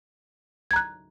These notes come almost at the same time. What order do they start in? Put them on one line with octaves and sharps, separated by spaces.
G#6 A#5 F#6